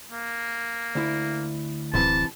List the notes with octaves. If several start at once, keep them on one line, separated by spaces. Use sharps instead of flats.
A#3
D2 E4
D1 C3 E3 A5